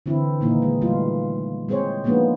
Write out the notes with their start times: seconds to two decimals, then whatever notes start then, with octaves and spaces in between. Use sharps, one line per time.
0.06 D3 E3 C4 E4
0.41 A#2 D#3 E3 A#3 D#4
0.62 G#3
0.81 E3 G3 A3 F4
1.69 G#3 C4 G#4 C5 C#5
2.04 F3 G#3 A#3 B3 D4 D#4